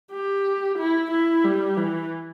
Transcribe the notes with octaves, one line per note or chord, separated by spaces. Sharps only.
G4
E4
E4
G3
E3